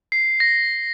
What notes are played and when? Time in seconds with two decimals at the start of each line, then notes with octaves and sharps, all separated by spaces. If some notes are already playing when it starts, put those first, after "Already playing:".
0.12 C7
0.40 A#6